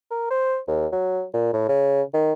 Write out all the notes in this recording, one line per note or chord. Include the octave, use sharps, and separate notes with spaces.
A#4
C5
D#2
F#3
A#2
A2
C#3
D#3